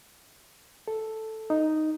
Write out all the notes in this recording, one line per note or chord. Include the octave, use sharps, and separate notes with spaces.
A4
D#4